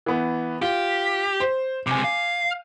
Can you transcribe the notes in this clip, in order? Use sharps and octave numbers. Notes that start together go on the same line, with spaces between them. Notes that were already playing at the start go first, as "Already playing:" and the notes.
E3 B3
F4 G4
C5
C#2 C3 G#5 D6
F5